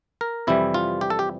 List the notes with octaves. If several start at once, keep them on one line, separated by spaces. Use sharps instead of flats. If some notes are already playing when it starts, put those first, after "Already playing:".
A#4
F2 C3 E3 G3 E4
F4
G4
A4
G4